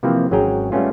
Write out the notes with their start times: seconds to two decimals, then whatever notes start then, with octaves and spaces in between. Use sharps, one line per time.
0.03 C3 E3 F3 A#3 C4 B4
0.31 G#1 F#3 C#4 G#4 G5 A#5
0.72 G3 A3 B3 C#4 F4